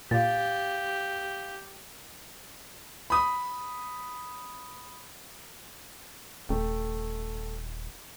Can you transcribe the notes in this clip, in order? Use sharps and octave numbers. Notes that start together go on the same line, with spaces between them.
A#2 G4 F5 A6
B5 D#6
D#1 A3 G5